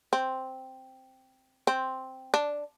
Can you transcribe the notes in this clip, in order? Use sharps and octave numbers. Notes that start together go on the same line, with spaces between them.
C4
C4
D4